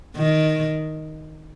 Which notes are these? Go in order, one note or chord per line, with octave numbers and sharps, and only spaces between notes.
D#3